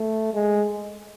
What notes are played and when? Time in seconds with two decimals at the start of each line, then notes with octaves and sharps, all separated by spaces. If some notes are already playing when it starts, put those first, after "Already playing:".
Already playing: A3
0.34 G#3